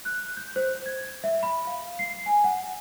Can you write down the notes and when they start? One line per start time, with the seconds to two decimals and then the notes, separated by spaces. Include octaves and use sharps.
0.05 F#6
0.37 G6
0.56 C5
0.86 G#6
1.24 E5
1.43 B5
1.67 F5
1.99 C7
2.26 G#5
2.44 F#5